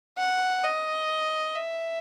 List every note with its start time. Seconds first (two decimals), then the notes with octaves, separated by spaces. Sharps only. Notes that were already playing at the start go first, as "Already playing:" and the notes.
0.18 F#5
0.63 D#5
1.55 E5